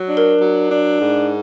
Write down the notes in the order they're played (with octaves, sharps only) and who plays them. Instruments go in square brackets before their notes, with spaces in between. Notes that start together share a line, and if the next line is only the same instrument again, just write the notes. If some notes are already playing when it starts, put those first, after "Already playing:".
Already playing: [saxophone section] F#3
D4
[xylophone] A#4
[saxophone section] F#3
D4
G#2